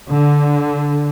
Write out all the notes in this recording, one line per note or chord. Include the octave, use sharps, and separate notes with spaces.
D3